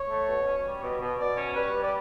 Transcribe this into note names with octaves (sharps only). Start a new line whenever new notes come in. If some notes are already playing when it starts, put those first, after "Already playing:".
Already playing: C#5
A3
B2
C#4
G3
B2
B2
B2 D5
C#4
G3 B4
G3
D5